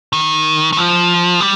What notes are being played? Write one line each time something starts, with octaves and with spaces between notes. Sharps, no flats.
D#3
D#3
F3
G3